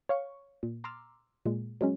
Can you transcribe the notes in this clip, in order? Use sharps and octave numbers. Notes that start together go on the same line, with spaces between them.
C#5 F5 C#6
A#2
A#5 C6 D6 E6 F6 A6
A#2 G#3
F#3 G#3 C#4